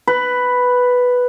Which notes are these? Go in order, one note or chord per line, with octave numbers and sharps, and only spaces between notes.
B4